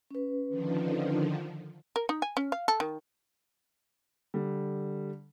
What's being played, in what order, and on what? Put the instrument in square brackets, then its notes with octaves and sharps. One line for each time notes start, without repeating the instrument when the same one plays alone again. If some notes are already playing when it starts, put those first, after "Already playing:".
[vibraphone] C#4 B4
[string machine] D3 D#3 F3
[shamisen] A#4
D#4
G#5
C#4
F5
A4
D#3
[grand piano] D3 G3